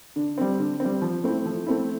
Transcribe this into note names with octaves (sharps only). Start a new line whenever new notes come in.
D3
G3 C4
D3
G3 C4
F3
A3 C4 E4
F3
A3 C4 E4